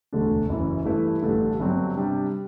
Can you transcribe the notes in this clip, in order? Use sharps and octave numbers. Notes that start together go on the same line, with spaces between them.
E1 D2 D3 A3 D4
F#1 F#2 E3
G2 E3 A3 E4 B4
A1 G2 D3 A3 D4
G1 G2 F#3 C4
C3 G3 D4 G4